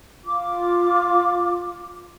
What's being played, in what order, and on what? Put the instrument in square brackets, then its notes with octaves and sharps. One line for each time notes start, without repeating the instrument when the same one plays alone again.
[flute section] F4 D6